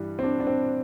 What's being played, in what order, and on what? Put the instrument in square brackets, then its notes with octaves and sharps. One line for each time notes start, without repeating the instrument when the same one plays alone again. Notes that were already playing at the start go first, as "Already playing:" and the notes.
Already playing: [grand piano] G2 E3 G3
C4
D4
D4
C4